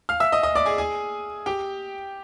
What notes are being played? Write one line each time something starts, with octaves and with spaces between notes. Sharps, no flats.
F5 F6
E5 E6
D#5 D#6
D#5 D#6
D5 D6
G#4 G#5
G#4 G#5
G4 G5